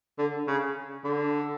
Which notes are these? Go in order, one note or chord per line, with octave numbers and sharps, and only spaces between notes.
D3
C#3
D3